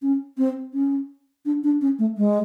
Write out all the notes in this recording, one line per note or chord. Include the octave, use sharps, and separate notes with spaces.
C#4
C4
C#4
D4
D4
C#4
A3
G#3